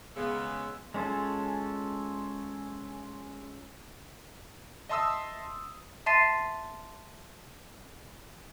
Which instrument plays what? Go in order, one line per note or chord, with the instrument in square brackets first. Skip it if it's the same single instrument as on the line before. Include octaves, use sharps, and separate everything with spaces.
[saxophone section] C#3 [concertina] G#3 E6 [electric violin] B3
[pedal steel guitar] G#3 C#4 F4 A4
[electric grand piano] D#5 E5 A5 C6 D#6 E6
[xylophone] E5 A5 C6 A6 C7 D#7